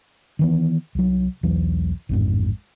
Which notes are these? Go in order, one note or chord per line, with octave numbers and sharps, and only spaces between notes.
D#3 E3 B3
C2 F#3
B1 E2 E3 F#3
A1 F2 G#2